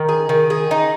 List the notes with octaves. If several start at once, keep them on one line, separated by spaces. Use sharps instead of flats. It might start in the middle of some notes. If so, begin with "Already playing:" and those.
Already playing: D#3
G#4
D#3
G#4
D#4